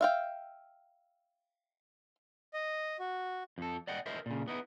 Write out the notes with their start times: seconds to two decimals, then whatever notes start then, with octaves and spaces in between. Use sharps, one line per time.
0.01 E5 F5 G5
2.54 D#5
2.99 F#4
3.58 F2 A4
3.87 D5 D#5 F#5 G5
4.06 E4 A#4 C5 D#5 E5
4.26 A#2 C#3
4.48 B3 D#4 E4